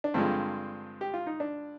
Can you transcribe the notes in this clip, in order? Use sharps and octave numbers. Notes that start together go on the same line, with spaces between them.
D4
G2 D3 F3 G#3 C4
G4
F4
D#4
D4